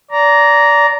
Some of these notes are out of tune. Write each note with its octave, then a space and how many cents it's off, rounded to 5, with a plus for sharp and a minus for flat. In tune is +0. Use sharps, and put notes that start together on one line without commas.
D5 -25 A#5 +0